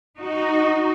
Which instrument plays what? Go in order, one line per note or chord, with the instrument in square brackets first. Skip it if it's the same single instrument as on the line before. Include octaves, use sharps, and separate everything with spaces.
[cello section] D#4 F#4